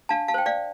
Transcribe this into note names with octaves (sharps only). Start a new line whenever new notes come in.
D4 F5 A5
F5 A5
C5 G5
D5 F5